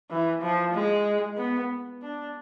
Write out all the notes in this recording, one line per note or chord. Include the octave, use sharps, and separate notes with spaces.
E3
F3
G#3
B3
D4